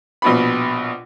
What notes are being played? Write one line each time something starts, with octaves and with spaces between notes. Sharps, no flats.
A#1 B2 B5